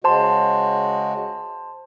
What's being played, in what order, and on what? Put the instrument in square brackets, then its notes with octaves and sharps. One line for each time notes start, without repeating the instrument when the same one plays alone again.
[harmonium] C#3 G#3 F#4 [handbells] C5 A5 C6